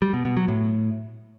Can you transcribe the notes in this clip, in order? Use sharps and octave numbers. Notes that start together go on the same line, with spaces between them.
G3
B2
B2
F#3
A2